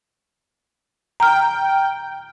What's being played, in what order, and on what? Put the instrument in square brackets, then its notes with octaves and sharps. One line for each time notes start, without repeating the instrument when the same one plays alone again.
[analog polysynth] G5 [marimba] A#5 F6